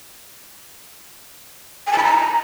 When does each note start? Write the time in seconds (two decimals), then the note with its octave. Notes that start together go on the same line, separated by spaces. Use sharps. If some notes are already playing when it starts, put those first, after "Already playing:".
1.87 G#5
1.92 A5
1.98 B5
2.04 A#5